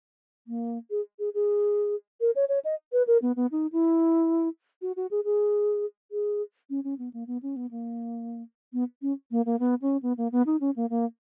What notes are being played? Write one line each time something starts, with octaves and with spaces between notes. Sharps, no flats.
A#3
G#4
G#4
G#4
A#4
C#5
C#5
D#5
B4
A#4
B3
B3
D#4
E4
F#4
F#4
G#4
G#4
G#4
C#4
C#4
B3
A#3
B3
C#4
B3
A#3
B3
C#4
A#3
A#3
B3
C#4
B3
A#3
B3
D#4
C#4
A#3
A#3